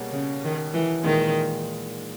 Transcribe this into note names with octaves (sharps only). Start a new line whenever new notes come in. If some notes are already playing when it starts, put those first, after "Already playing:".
Already playing: B2 G3 A#3 C#4 G#4
C#3
D#3
E3
A#2 D#3 G#3 D#4